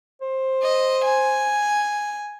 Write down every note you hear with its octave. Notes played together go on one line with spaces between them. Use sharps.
C5
D#5
G#5